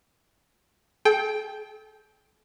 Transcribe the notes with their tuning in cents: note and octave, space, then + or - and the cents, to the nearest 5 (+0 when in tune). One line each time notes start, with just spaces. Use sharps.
A4 -40 G5 +5